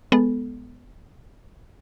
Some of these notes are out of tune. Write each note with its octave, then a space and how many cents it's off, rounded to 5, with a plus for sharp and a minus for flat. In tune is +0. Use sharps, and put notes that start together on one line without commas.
G#3 +0 B3 +0 A4 +0